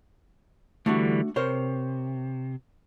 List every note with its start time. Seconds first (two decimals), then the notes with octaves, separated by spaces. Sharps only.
0.86 D3 E3 G3 A3 D4 F#4
1.36 C3 A#4 C5 C#5